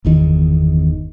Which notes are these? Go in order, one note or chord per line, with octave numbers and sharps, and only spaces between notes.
G1 E2 D#3